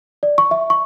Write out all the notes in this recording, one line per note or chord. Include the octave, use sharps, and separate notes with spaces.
D5
C#6
E5
C#6